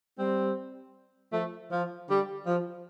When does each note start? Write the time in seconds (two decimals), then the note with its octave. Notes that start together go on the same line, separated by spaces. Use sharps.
0.18 G3 C4
1.32 F3 A3
1.70 F3
2.07 D3 G3
2.45 F3